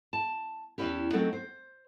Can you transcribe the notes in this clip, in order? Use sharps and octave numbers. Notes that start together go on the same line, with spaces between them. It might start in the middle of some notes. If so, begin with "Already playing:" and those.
A5
E2 C3 B3 C#4 E4 G4
F#3 A3 C4 D#4 A4 F#5
C5